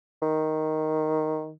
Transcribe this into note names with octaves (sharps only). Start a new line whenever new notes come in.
D#3